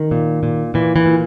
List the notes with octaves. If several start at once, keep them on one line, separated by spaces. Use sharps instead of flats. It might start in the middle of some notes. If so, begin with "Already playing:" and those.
Already playing: D#3
A#2
A#2
A#2 E3
E3
A#2